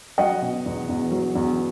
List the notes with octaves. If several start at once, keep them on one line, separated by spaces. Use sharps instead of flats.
F#3 D#5 F#5
B2
E2
E2
F#3
E2